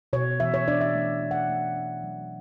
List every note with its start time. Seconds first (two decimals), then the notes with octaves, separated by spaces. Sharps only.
0.13 B2 C#5
0.40 E3 E5
0.54 C#5
0.68 D4 D5
0.81 E5
0.94 A3
1.22 A3
1.31 F#5
1.49 A3
1.76 D4
2.03 F#3